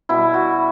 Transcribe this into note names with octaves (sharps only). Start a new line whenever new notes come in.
B2 G3 E4
F#4